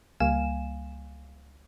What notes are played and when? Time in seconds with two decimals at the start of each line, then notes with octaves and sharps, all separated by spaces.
0.20 C#2 G3 A#3 F5 G#5 E7